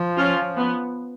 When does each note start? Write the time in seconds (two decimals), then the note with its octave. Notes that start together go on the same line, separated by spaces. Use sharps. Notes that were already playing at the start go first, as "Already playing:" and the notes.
Already playing: F3
0.17 C#4 F4
0.56 B3